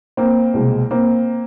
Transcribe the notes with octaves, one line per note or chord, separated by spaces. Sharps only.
A#3 C4
C2 B2 G#3
A#3 C4